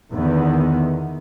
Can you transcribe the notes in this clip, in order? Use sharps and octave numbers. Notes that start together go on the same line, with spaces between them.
E2 D3 D#3 B3